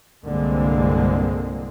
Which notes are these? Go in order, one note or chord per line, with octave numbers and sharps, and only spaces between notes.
C2 G2 D3 G#3 A#3 C4